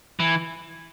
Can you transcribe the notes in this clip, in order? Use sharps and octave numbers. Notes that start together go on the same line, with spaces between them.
E3